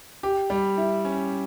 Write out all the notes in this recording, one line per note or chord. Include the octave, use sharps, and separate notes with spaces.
G4
G3
E4
C#4